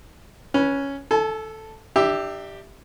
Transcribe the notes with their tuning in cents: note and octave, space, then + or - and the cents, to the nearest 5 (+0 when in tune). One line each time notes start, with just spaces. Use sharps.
C#4 +0 B4 -20
A4 +0 G#5 +45
D4 +35 G4 +0 E5 +0